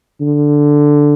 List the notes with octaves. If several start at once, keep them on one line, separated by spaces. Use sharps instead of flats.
D3